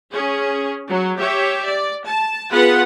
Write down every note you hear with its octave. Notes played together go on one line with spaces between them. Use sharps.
C#4 G#4
F#3
G4 C#5 E5
D5
A5
B3 F4 G#4 B4 F#5